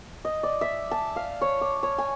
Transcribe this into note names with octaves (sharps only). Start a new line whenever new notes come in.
D#5
D5
E5
A5
F5
C#5
D6
C#5
G#5